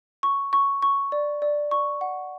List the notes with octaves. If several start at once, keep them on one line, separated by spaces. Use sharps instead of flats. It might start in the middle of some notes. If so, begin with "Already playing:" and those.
C#6
C#6
C#6
D5
D5
C#6
F#5